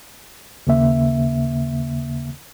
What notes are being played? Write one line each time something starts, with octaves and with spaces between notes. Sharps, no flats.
D#2 C#3 A#3 E5